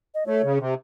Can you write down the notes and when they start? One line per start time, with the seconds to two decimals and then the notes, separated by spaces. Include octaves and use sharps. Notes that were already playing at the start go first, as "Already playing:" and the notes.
0.14 D#5
0.26 A3 C#5
0.43 C#3
0.59 C3